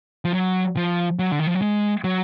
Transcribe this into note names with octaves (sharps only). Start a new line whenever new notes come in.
F3
F#3
F3
F#3
D3
D#3
F3
F#3
G#3
F#3